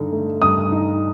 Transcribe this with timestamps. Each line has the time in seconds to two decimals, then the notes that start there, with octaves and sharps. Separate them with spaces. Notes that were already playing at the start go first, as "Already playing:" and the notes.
Already playing: G2 D3 D#4
0.12 A3
0.42 G2 D#6
0.72 D#4